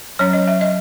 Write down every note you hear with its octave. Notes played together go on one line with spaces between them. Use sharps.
F#3 C#4 C#5
D#5
E5
D#5